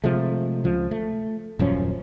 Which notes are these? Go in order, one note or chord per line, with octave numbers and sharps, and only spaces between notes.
C3 F3 G#3 A3
C#2 F3
A3
D#1 F#2 F3 C#4